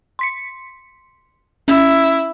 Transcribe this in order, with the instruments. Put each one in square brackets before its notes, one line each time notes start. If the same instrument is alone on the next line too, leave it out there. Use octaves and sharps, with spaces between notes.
[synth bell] C6 B6 C#7
[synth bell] C#4 [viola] E4